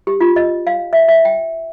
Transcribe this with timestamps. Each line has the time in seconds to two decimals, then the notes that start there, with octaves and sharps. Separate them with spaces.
0.07 G4
0.21 F4
0.36 D#5
0.67 F5
0.93 E5
1.08 E5
1.25 G5